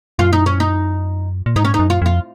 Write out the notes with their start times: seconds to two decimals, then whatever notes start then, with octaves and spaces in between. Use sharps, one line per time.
0.19 F#2 F4
0.33 D#4
0.46 C#4
0.60 D#4
1.46 A#2
1.56 G#2 D#4
1.65 C#4
1.74 D#4
1.79 F#2
1.90 F4
2.02 F2 F4